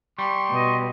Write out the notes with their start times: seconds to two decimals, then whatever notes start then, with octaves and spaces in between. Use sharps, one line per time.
0.19 G3 C6 C#6
0.51 B2 D#5